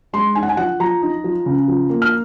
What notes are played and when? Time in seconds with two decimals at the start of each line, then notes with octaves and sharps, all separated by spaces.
0.13 G#3 C6
0.35 D#4 G#5
0.43 F#5
0.49 G#5
0.57 F3 F#5
0.80 F3 A#5
1.02 D#4
1.24 F3
1.46 C#3
1.68 F3
1.90 A#3
2.02 F6